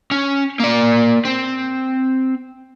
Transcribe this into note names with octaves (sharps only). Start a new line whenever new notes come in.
C#4
A#3 D5
C4